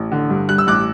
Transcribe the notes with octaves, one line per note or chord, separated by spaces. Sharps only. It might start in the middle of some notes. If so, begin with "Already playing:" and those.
Already playing: A1
D3
G2
G3 F#6
E6
A1 D6 F#6